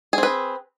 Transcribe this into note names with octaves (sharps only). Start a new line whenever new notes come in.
C4 G#4 B4